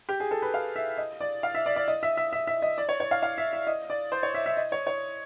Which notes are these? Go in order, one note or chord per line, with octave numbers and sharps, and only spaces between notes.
G4
G#4
A4
B4
F5
E5
D#5
D5
F5
E5
D5
D5
D#5
E5
E5
E5
E5
D#5
D5
C#5
C#5
F5
F5
E5
E5
D#5
D5
C5
C#5
E5
E5
D#5
C#5
C#5